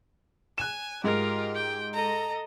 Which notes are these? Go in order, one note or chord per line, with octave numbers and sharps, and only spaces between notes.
G#5 F#6 E7
G#2 F4 G4 A#4
G5
A4 D#5 A#5